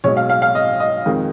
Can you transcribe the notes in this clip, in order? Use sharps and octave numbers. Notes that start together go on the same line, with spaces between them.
B1 B2 G#3 C#5
F5
F5
F5
D#5
D#5
F2 D#3 G#3